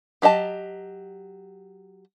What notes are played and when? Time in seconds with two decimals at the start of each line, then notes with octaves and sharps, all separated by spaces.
0.22 F#3 G4 D#5 A5